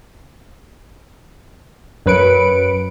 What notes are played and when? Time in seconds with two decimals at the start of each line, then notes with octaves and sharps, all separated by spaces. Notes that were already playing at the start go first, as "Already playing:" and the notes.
2.06 F#2 F#3 B4 B5 C#7 D7